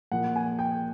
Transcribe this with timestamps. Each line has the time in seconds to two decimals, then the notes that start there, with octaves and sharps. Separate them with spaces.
0.12 A#2 F3 F#5
0.36 G#5
0.59 G5